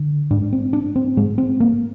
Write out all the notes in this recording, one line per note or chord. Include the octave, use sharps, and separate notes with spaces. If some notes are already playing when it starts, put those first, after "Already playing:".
Already playing: D3
G#2 D4
C4
D4
C4
G#2 G#3
C4
A#3